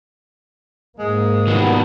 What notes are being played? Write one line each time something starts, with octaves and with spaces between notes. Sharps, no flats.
G#2 G#3 A#3
G2 D#3 F#3 B3